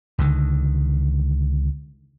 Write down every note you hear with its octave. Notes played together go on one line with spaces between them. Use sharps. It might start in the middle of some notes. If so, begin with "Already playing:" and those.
C#2 D3 D#3